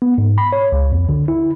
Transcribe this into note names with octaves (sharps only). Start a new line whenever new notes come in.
B3
G#2
B5
C#5
C#2
F2
D3
E4